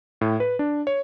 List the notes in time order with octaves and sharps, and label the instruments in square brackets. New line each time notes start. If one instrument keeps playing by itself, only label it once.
[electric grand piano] A2
B4
D4
C#5